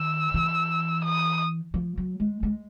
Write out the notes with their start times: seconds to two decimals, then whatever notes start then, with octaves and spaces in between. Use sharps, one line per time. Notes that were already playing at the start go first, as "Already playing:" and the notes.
Already playing: D#3 E6
0.34 E3
1.05 D#6
1.74 F3
1.98 F#3
2.20 G#3
2.43 G#3